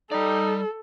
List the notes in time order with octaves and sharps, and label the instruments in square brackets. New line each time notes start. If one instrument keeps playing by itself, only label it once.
[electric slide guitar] G3 D5 [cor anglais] D#4 [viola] A4